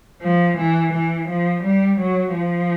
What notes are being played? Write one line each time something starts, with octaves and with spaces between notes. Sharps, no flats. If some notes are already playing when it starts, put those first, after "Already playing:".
F3
E3
E3
F3
G3
F#3
F3